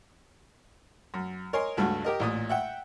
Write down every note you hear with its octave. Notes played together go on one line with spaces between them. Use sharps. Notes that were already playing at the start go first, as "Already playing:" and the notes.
F#2
A#4 C#5 D#5 G#5 C6
C#2 G2 A3 F#4
G4 A#4 D#5
A1 A#2 D#6
E5 F#5 G5